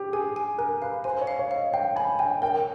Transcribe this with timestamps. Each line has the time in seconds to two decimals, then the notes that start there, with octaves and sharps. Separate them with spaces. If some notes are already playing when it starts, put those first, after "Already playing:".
Already playing: G4
0.13 G#4 G#5
0.36 G#5
0.58 A#4 G#5
0.82 B4 F5
1.04 C5 G#5
1.21 C#5
1.27 F5
1.39 C#5
1.51 D#5 F5
1.74 F5 G5
1.96 G#5 B5
2.19 G5 G#5
2.42 A#4 G5